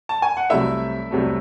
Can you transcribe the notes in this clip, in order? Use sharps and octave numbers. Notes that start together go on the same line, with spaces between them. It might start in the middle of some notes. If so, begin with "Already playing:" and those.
A5
G#5
F#5
C2 C3 F#3 A3 E4 E5
C2 C3 F#3 A3